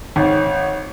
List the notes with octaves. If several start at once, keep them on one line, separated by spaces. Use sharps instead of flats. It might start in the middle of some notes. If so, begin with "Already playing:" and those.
G#1 C#5